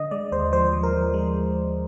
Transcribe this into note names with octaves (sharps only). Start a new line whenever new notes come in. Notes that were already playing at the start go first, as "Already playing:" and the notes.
Already playing: D3 D#5
G#3 D5
D#2 C5
F3 C5
F3
A#4
F3
G#3